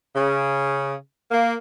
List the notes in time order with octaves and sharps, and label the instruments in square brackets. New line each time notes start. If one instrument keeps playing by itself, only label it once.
[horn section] C#3
A#3